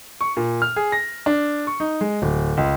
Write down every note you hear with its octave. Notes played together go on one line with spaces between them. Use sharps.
C#6
A#2
F6
G#4
A#6
D4
C#6
D#4
G#3
D1
C#2